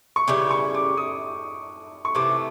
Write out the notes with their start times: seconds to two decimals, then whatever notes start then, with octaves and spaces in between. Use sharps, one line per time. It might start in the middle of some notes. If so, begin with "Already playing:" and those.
0.16 C#6
0.28 C#3 E3 G3 D6
0.51 C#6
0.74 D6
0.97 D#6
2.05 C#6
2.15 C3 E3 A3 D6